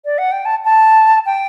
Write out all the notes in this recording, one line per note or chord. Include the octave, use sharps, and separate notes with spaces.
D5
F#5
G5
A5
A5
G5